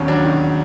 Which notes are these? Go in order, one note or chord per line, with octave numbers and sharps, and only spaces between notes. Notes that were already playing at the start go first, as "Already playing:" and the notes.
Already playing: E1 D#2 D#3 C#4
F#3 D4
D#3